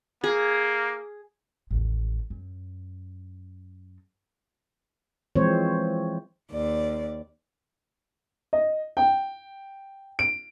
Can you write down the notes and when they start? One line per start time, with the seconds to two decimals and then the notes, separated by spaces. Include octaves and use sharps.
0.24 A#3 G#4
1.71 A1 D#2
2.30 F#2
5.36 E3 F3 G#3 C4 C5 C#5
6.50 D#2 D5
8.53 D#5
8.97 G5
10.19 D7